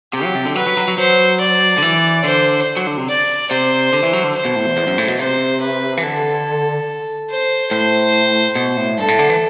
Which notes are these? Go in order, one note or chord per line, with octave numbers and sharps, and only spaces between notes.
C3 G4
F#3
C3
D3
F#3 B4
F#3
F#3
F#3
F#3 C5
D5
D3
E3
D3 C5
F#3
D3
C3
D5
C3 C5
D3
E3
F#3
D3
C5
B2
A2
E2
E2
F#2
A2
B2
C3 C5
B4
E3
D3 A4
C5
A2 C5
B2
A2
G2 A4
A2
D3
E3